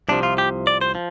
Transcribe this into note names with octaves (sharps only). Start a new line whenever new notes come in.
C2 C3 F3 D4
F4
G4
D5
C5
F3